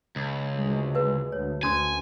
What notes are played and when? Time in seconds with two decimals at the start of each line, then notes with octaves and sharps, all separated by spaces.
0.16 C#2
0.56 D2 G#3
0.95 B4 F5
1.32 D2 C#5
1.63 D2 C#4 G#5 C6 D#6